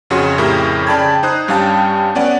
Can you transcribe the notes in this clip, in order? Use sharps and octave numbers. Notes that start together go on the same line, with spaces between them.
F2 C#3 F#4 G#4 C#5 C6
F2 A2 C#3 E4 G4 A#4
C#3 D5 G5 A5 B5 G#6
D#4 C5 D#6 F#6
G2 G3 C#4 F5 G5 A5
B3 C#4 D5 F#5